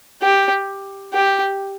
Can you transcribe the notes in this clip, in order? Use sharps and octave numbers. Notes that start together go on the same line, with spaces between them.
G4
G4